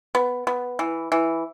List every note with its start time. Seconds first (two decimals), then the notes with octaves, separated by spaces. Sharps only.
0.15 B3
0.47 B3
0.79 E3
1.12 E3